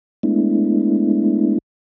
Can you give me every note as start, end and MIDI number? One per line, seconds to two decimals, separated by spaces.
0.23 1.58 56
0.23 1.58 57
0.23 1.58 59
0.23 1.58 62
0.23 1.58 64